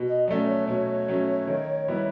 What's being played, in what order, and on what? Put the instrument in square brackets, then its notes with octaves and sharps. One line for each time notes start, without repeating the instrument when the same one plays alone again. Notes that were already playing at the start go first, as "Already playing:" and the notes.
Already playing: [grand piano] B2
[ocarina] D#5
[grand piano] F#3 A3 C#4 [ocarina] D5
[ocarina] C#5
[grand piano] B2 [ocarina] C#5
[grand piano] F#3 A3 C#4
D#3
G3 B3 E4